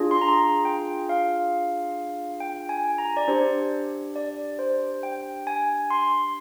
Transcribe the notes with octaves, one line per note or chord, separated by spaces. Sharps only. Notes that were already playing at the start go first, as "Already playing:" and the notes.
Already playing: D4 F4 G#4
C6
A#5
G5
F5
G5
G#5
A#5
D5
D4 G4 C5
D5
C5
G5
G#5
C6